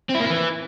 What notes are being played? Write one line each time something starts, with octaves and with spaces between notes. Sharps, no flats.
C4
E4
A#3
E4
E3